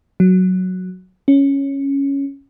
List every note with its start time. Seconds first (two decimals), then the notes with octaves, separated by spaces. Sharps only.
0.20 F#3
1.28 C#4